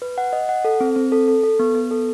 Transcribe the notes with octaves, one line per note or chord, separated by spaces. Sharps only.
B4
F#5
D#5
F#5
A4
C4
C4
A4
A4
A4
B3
B3
A4